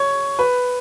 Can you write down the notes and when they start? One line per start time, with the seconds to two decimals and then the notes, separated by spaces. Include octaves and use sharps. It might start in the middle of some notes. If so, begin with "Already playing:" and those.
Already playing: C#5
0.39 B4